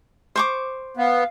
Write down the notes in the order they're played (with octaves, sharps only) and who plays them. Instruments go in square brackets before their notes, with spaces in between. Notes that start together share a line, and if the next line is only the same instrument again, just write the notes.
[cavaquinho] C5 C#6 D6
[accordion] B3 [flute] F5